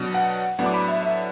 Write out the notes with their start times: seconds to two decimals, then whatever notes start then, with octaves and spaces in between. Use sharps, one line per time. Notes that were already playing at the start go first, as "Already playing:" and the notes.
Already playing: B2 F#3 D4
0.14 F#5
0.59 A2 F#3 B3 D4 F#5
0.66 D6
0.74 B5
0.88 E5
1.03 E5